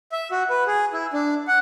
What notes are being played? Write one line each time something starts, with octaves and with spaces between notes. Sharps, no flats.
E5
F#4
B4
G#4
E4
D4
F#5